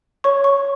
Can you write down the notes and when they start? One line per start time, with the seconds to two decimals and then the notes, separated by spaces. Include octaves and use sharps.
0.24 C#5 C#6
0.44 C#6